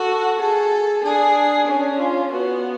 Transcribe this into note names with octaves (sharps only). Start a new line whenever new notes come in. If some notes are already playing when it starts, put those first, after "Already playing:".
Already playing: F#4 A4
G#4 A4
D4 G#4
C#4 D4
F4
B3 F#4